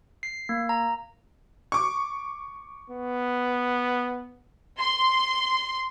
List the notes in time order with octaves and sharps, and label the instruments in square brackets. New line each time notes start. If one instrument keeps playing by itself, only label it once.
[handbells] C7
A#3
A#5
[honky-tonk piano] C#6 D6
[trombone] B3
[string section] C6